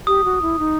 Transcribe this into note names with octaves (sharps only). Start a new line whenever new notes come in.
G4 D#6
F#4
E4
D#4